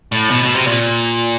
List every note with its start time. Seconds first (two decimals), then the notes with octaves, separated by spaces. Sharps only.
0.12 A2
0.30 B2
0.43 B2
0.55 C3
0.67 A#2